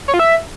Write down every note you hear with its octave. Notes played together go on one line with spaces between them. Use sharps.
C#5
F4
E5